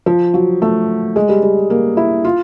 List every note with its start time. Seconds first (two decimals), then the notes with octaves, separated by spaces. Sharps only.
0.06 F3
0.34 F#3
0.62 A3
1.16 G#3
1.29 G3
1.43 G3
1.70 A#3
1.97 E4
2.25 F4